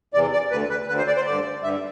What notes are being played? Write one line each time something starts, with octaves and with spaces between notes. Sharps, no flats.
E2 C3 E3 D5
D5
D2 D3 B4
B4
D2 D3 B4
C5
D5
C5
G2 D3 D5
G2 D3 E5